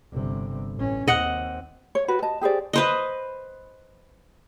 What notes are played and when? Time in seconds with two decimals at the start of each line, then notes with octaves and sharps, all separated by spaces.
0.12 G1 C3
0.75 A1 C#4
1.08 D#2 C4 D#5 F#5
1.95 C#5
2.08 F#4 B4
2.22 D#5 A5
2.41 G4 G#4 C5 D5
2.73 B4 C5 D#5